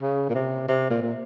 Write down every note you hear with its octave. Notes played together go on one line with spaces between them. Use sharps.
C#3
A#2
C3
C3
A#2
A#2